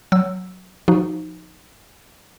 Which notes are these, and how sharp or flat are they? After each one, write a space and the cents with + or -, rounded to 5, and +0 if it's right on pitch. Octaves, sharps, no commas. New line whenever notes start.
F#3 +0 E6 +0
F3 +5 D#4 +0 F#4 +0